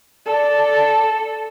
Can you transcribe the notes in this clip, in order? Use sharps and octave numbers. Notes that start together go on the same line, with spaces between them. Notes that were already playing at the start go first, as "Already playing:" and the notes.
A4 D5